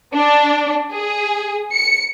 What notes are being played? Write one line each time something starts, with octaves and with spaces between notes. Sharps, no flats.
D4
G#4
C#7